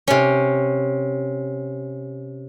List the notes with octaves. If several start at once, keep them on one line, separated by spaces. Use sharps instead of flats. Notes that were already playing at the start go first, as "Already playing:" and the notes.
C3 C#4